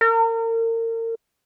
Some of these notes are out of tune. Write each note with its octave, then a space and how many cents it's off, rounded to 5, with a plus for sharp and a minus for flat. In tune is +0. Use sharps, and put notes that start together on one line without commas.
A#4 -35